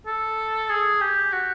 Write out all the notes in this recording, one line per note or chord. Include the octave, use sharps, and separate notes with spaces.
A4
G#4
G4
F#4